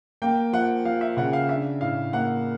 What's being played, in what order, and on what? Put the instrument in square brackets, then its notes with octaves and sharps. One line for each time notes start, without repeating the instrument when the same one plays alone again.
[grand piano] A#3 [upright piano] G5
[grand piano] F3 [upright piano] F#5
[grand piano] F3 [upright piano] F5
[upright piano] E5
[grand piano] C#3 [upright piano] F#5
[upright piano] F5
[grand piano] D4 [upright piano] E5
[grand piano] A2 [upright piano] F5
[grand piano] A#3 [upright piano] F#5